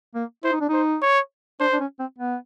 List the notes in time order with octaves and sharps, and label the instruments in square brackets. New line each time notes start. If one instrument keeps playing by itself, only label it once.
[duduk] A#3
[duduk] E4 [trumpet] C5
[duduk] D#4
D4
[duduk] D#4 [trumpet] C5
[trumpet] C#5
[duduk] D4 [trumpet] C5
[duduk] D4
C#4
C4
B3